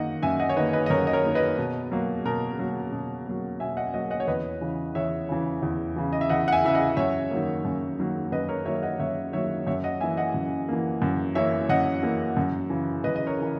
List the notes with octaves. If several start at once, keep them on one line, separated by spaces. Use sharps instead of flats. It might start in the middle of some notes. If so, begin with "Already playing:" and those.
Already playing: F#2 D#3 A#3 D#5 F#5
F#2 E5 G#5
D#5 F#5
C#5
D#3 A#3 B4 D#5
B4 D#5
D#5
F#2 A#4 C#5
D#5
A#4 C#5
D#3 A#3
B4 D#5
B2
F#3 A#3
B2 A#4
F#3 A#3
B2
F#3 A#3
B2 E5 G#5
D#5 F#5
F#3 A#3 D#5 F#5
D#5 F#5
C#5
E2 B4 D#5
C#3 E3
E2 C#5 E5
C#3 E3
E2
C#3 E3
D#5
E5
E2 D#5 F#5
F#5
E5 G#5
C#3 E3 E5
D#5 F#5
F#2 C#5 E5
D#3 F#3 A#3
F#2
D#3 F#3 A#3
F#2 B4 D#5
A#4 C#5
D#3 F#3 A#3 C#5 E5
D#5 F#5
F#2 C#5 E5
D#3 F#3 A#3 C#5 E5
F#2 C#5 E5
D#5 F#5
E3 A#3 E5 G#5
D#5 F#5
F#2
E3 A#3
F#2
E3 A#3 C#5 E5
F#2 D#5 F#5
E3 A#3
F#2
C#3 E3
F#2 B4 D#5
D#5
A#4 C#5
C#3 E3 A#4